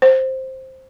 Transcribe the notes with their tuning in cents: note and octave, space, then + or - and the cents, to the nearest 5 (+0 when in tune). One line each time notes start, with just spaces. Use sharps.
C5 +5